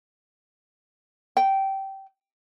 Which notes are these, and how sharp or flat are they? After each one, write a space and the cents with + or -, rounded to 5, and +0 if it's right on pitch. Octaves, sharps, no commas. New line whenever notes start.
G5 -15